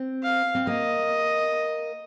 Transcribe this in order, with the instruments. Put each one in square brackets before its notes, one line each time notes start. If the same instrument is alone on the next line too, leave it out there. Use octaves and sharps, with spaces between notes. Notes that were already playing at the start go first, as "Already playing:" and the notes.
Already playing: [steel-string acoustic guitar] C4
[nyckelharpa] F5
[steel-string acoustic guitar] C4
[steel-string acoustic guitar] A#3 [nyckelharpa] D#5